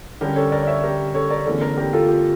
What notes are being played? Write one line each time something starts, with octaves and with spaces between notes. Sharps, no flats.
D3 G3 C#4 G4 A#4
A4 C#5
A#4 D5
D5
C#5 E5
G4 A#4
A4 C#5
A#4 D5
E2 D3 A3 C#4
A#4 D5
G4 A#4
F4 A4
G4